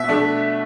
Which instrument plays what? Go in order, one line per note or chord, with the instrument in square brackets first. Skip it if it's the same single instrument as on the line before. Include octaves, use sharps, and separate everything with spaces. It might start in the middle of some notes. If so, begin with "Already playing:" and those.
Already playing: [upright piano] B2 E5
A3 D4